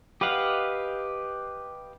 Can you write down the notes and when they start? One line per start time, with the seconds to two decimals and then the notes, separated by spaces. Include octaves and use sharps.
0.21 G4 B4 D#5 F5 F#5